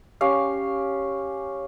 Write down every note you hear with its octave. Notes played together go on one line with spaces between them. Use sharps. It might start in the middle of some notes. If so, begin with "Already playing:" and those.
C#4 G4 F5